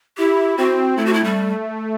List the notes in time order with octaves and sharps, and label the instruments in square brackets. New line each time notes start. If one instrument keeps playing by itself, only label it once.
[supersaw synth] E4 [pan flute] G4
[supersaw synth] C4 [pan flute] F#4
[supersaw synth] A3 [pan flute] E4
[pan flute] F#4
E4
G3